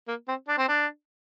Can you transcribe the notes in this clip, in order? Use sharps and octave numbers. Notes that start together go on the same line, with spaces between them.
A#3
C4
D4
C4
D4